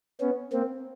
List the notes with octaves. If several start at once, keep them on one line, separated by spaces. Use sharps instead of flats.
B3 C#4
A#3 C4